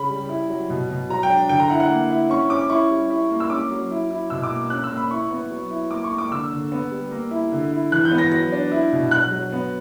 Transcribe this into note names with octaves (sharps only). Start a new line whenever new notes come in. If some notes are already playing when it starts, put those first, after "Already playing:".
Already playing: C#3 C#4 B5
G3
E4
F#3
B2
B2
F#3 A#5
G5
D4
D3 G5
A#5
E4 F#5
F#5
A#3
E4
C#4 C#6
C#4 D6
E4 C#6
G3
E4
A#3
E6
C#4 D6
F#3
E4
E4
B2 E6
D6
A#3
C#4 F#6
E6
A#3
B5
E4 C#6
B3
F#3
E4
A#3 D6
C#6
A#3
D6
D3 E6
D3
B3
G3
A#3
E4
D3
E4
E3 F#6
G6
B3
A#6
F#3 A#6
D4
E4
B2
F#3 F#6
F#3
B3